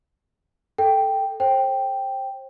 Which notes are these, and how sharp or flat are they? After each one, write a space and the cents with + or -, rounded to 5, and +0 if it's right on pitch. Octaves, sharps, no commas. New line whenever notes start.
A4 +0 G5 +0
C5 +30 G5 +0